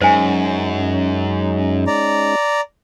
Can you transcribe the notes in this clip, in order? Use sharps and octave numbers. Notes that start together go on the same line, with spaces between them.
F#2 G#3 C#4 D#4 C5 G#5
D5 A#5